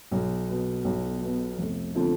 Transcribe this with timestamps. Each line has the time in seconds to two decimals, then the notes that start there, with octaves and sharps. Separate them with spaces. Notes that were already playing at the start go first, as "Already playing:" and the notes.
0.11 B1
0.48 B2 B3
0.84 B1
1.21 B2 B3
1.58 F1
1.95 D3 F3 C4